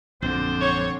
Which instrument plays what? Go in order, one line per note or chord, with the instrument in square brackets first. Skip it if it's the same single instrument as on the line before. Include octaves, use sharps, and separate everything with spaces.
[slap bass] A#1 F#2 [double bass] D3 C4 [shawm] C5
[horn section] C#5